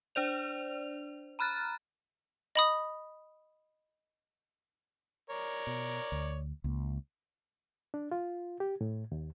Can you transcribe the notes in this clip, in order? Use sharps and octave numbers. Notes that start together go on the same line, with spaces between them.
D4 C5 D5 F7
A#5 B5 F6 F#6 A6
D#5 B5 D#6
A#4 C#5 D5
B2
D2
C#2 A#3
D4
F4
G4
A2
D#2